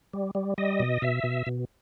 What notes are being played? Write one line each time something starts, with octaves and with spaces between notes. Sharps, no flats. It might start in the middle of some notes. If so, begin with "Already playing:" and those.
G3
G3
G3 D#5
B2
B2 E5
B2
B2